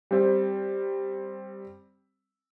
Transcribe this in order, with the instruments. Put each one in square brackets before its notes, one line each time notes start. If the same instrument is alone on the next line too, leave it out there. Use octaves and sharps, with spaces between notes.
[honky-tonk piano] G3 C4